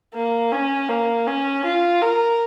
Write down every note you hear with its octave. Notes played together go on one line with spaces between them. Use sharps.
A#3
C#4
A#3
C#4
F4
A#4